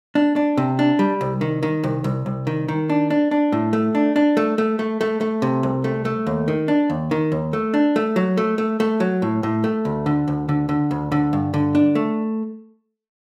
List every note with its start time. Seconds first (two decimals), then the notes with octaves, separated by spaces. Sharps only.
0.15 D4
0.36 D4
0.57 C3
0.79 D4
0.99 G3
1.21 C2
1.41 D#3
1.63 D#3
1.84 C2
2.04 C2
2.26 C2
2.47 D#3
2.68 D#3
2.90 D4
3.10 D4
3.31 D4
3.52 A2
3.73 A3
3.95 D4
4.16 D4
4.37 A3
4.58 A3
4.79 A3
5.01 A3
5.21 A3
5.42 C3
5.63 C2
5.84 A3
6.05 A3
6.27 D#2
6.48 D#3
6.68 D4
6.90 D#2
7.11 D#3
7.32 D#2
7.53 A3
7.74 D4
7.96 A3
8.16 F#3
8.37 A3
8.58 A3
8.80 A3
9.00 F#3
9.22 A2
9.43 A2
9.64 A3
9.85 D2
10.06 D3
10.28 D2
10.49 D3
10.69 D3
10.91 D2
11.12 D3
11.33 G2
11.54 D3
11.75 D4
11.95 A3